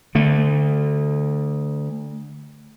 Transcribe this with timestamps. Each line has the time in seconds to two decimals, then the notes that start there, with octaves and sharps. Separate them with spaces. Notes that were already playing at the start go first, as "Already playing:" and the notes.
0.15 D3 A3